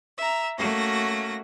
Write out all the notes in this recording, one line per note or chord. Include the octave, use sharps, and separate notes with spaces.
E5 A#5
A3 A#3 C#4 F#4 A#6